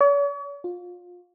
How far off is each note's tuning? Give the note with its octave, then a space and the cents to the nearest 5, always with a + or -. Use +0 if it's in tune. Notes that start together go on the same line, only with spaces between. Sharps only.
C#5 +45
F4 +25